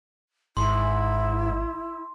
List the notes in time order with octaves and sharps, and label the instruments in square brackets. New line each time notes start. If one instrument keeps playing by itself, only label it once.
[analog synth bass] G#1 [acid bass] G#2 [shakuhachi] E4 [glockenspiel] C6